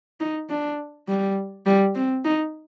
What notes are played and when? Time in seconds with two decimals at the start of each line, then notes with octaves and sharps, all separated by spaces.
0.20 D#4
0.50 D4
1.08 G3
1.66 G3
1.95 C4
2.25 D#4